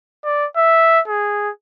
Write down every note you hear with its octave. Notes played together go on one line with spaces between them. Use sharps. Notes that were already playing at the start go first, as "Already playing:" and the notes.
D5
E5
G#4